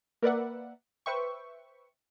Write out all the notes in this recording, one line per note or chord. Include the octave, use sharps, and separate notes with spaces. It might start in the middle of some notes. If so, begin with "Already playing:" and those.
A#3 A#4 B4 D5 E5 F#5
B4 C5 E5 G5 C#6